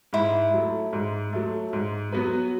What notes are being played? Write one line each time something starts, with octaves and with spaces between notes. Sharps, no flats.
G#2 E4
F#3 A3
G#2
F#3 A3
G#2
F#3 B3 F#4 B4